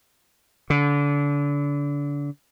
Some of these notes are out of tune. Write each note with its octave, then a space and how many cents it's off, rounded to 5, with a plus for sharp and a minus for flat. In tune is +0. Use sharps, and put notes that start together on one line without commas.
D3 -30